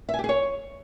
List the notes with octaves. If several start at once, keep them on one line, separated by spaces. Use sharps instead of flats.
E5
G#5
G4
G#4
C#5